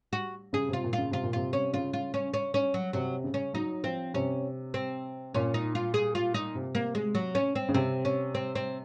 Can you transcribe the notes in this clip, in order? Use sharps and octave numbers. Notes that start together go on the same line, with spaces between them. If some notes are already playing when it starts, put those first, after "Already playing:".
F#4
C#3 G#4
C3 F4
A#2
F4
C#3
C3 F4
A#2
C3 F4
C#4
C#3 F4
F4
C#4
C#4
C#4
F#3
C3 F#3
C#3
C#4
F#3 D#4
F3 C4
C3 C#4
C4
A#2 C#4
D#4
F4
G#4
F4
D#4
C3
A#3
G#3
F#3
C#4
C4
C#3
C3 C4
C#4
C4
C4